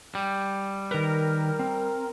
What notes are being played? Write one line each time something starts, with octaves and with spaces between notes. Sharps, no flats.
G3
D#3 A#4 B4
C4